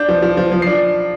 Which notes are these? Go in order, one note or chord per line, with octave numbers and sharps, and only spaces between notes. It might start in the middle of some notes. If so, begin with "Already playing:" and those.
Already playing: D4 G6
F3
F3
F3
F3
C7
D4